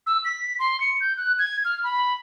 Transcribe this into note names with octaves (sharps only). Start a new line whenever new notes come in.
E6
B6
C6
C#7
G6
F#6
G#6
F6
B5